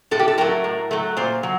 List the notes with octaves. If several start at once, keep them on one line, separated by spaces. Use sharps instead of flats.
A2 A4
G4
A4
F#3 A3 A#4
A2
F#3 A3
A#2 C5
F#3